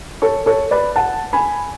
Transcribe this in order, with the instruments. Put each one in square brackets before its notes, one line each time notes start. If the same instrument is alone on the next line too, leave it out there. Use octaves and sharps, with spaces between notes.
[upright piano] A4 C#5
A4 C#5
B4 D5
F#5 A5
G#5 B5